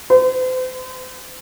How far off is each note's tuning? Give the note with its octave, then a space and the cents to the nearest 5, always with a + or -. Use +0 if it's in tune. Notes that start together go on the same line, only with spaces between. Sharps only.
C5 -40